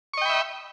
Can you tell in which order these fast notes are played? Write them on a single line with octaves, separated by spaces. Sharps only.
C#6 D#5 G5 B5 E5